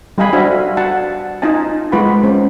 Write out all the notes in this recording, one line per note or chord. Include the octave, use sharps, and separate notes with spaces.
G3 G4 D#5 F5 G#5 B5
D4 F#4 C5 E5 F5
F#4 F#5 A5
D#4 F4 D#5 G#5 A5
G#3 F4 B4 F#5 B5
G#3 C#4 C5